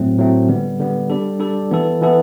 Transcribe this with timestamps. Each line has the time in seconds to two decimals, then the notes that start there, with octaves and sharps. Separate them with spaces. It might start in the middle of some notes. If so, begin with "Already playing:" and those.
Already playing: A2 F#3 A3 C4
0.18 A2 F#3 A3 C4
0.48 D3 G3 B3
0.79 D3 G3 B3
1.10 G3 D4 A4
1.40 G3 D4 A4
1.71 E3 B3 E4 A4
2.02 E3 B3 E4 A4